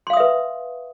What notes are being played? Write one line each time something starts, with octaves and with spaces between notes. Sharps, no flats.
B4 E5 F5 C6 D#6